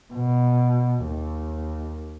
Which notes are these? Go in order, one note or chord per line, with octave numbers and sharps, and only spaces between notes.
B2
D#2